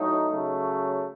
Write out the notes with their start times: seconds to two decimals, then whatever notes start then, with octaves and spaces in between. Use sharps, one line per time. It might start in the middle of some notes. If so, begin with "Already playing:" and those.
Already playing: A2 F#3 A3 D#4
0.29 C#3 F#3 A3